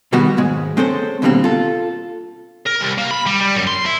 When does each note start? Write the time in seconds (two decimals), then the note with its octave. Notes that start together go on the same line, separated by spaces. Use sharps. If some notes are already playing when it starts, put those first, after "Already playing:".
0.13 B2 D#3 G3 B3 F#4 G4
0.37 D#2 G#2 G#3
0.77 G#3 C4 C#4 A4 C5
1.22 D#2 B2 D3 G3 A#3 C4
1.44 F4 A4
2.67 A#4
2.81 C2
2.98 A#3
3.11 B5
3.27 G3
3.41 G3
3.55 F#2
3.67 C6
3.86 E4